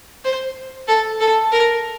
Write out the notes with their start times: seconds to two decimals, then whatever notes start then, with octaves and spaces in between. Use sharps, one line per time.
0.25 C5
0.88 A4
1.20 A4
1.52 A#4